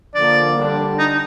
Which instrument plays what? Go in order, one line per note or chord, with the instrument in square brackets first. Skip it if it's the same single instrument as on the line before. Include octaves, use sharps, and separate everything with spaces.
[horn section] D3 F3 A#3 [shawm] D5
[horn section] D3 G3 D4
[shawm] D#4